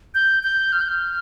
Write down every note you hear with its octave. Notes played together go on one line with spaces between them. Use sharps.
G6
G6
F6
G6
F6